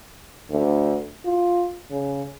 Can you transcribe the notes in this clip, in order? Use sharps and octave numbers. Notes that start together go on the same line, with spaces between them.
D2
F4
C#3